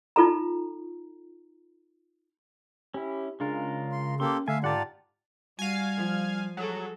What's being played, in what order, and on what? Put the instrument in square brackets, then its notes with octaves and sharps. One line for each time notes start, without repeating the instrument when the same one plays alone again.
[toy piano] D#4 F4 A4 A#5
[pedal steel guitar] C#4 E4 [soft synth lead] G4
[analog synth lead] C#3 [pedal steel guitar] G#3 F4 A#4 [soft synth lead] D4
[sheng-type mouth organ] C6
[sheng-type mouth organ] A#3 G4 A4 [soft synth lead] C#4 [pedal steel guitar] C6
[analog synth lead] D3 [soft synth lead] A3 [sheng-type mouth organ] E5 F5 [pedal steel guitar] G#5
[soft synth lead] G#2 [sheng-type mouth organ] F4 G4 D5 [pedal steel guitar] F#5 A5 A#5
[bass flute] G3 [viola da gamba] F#4 [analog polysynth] F5 G#5
[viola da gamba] F3
[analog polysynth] F#3 [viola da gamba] G3 G#4 A4